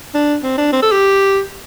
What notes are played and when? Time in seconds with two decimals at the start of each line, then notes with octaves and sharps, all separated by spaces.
0.14 D4
0.43 C4
0.58 D4
0.73 C4
0.82 A4
0.92 G4